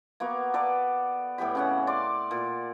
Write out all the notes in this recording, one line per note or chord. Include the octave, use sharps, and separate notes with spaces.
A#3 B3 F#4
A4 B4 D5
A2 B3 G4 B5
C#3 C#4 F#5
D5 C6 D6
A#2